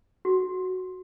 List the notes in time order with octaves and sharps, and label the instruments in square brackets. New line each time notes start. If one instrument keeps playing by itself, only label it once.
[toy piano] F#4